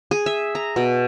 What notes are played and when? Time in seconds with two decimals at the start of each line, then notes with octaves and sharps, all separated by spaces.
0.11 G#4
0.26 E5
0.55 A#5
0.76 B2